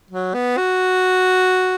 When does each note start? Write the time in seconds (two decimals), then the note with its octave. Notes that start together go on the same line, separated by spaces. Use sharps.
0.11 F#3
0.34 B3
0.57 F#4